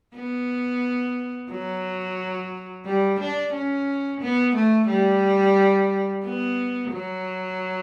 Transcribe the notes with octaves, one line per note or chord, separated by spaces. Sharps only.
B3
F#3
G3
D4
C#4
B3
A3
G3
B3
F#3